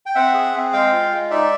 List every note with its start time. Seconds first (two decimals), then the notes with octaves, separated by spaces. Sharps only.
0.06 G5
0.15 C4 E5 F#5
0.34 G#4
0.54 C4
0.73 G#3 F5 G5
0.92 F4
1.11 G#3
1.30 D#4 D5 E5